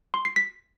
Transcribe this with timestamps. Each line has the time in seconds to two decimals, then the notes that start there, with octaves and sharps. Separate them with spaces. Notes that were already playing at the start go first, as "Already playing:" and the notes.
0.14 C6
0.25 C7
0.36 B6